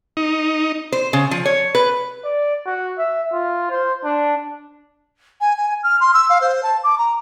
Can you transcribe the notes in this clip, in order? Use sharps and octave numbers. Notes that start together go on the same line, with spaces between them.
D#4
C5
C#3
F3
C#5
B4
D5
F#4
E5
F4
C5
D4
G#5
G#5
F6
C6
E6
F5
C5
A5
D6
A#5